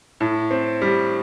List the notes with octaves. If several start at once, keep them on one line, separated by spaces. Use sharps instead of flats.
A2
C4
G3